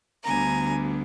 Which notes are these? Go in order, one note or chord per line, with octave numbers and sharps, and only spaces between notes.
D2 D3 G3 B3 G#5 A#5